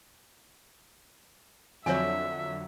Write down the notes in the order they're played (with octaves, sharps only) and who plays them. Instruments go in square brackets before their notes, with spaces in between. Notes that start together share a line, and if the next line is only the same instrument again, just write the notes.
[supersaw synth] F2 D3 F#3 [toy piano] C#5 G#5 [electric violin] E5